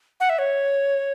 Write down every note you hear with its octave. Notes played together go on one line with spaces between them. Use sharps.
F#5
E5
C#5